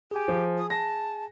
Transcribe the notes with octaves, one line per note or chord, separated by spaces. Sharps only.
G4 G#4 G#5
F3
D#6
A5 A#6